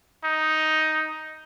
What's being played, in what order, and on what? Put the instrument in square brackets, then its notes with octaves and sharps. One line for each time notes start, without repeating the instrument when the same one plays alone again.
[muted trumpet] D#4